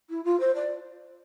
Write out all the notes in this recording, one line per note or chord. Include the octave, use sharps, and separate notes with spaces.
E4
F4
C5
D5